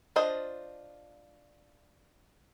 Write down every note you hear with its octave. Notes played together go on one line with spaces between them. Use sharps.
D4 F4 C5 D#5